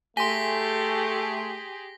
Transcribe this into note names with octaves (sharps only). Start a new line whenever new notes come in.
A3 G4 G#4 G#5 C6 A#6 B6 G7